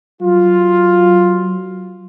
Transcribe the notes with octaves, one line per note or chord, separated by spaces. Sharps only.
F#3 F4